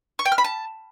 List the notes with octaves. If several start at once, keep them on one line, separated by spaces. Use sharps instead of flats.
C#6
G5
F6
B5
A5